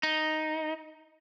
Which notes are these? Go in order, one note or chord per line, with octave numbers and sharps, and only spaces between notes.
D#4